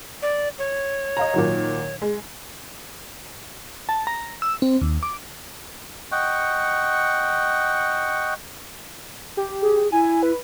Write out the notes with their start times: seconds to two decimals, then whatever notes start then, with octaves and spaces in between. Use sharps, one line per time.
0.22 D5
0.59 C#5
1.17 D#5 F5 A#5
1.34 A#2 D#3 F#3
2.02 G#3
3.89 A5
4.07 A#5
4.42 E6
4.62 C4
4.81 D#2
5.03 D6
6.12 D#5 F#5 G5 C#6
9.37 G4
9.62 G#4
9.92 E4 G#5
10.23 B4